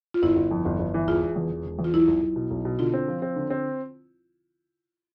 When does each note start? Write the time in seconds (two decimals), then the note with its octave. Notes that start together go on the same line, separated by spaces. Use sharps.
0.14 F4
0.22 G1 E4
0.36 G1
0.51 F2
0.65 G1
0.79 G1
0.94 E3
1.07 E1 F4
1.22 E1
1.36 E2
1.51 E1
1.65 E1
1.79 E2
1.84 F4
1.94 B1 E4
2.07 B1
2.22 B1
2.36 B2
2.50 B1
2.65 B2
2.79 D3 F4
2.94 C4
3.08 F3
3.22 C4
3.36 D3
3.50 C4